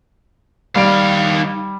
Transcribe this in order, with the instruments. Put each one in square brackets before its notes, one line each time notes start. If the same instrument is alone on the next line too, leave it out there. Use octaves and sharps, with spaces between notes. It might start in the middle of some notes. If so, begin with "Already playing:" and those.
[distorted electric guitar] D#3 F5 [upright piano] G3 D7